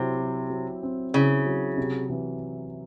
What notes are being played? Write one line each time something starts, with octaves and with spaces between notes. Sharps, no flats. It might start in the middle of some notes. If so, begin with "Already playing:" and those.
Already playing: C3 F#3 C4 E4
F#3
F#3
C4
C#3 E4
F#3
C3
E3